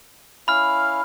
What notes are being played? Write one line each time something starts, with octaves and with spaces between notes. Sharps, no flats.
C#4 E4 F5 B5 F6